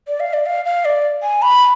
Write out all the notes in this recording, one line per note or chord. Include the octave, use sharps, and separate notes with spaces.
D5
F5
D5
F5
F5
D5
G#5
B5